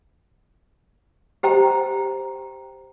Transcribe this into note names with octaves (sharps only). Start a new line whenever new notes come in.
G4 C5 G5 A#5